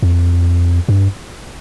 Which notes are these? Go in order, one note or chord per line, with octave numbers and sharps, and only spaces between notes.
F2
G2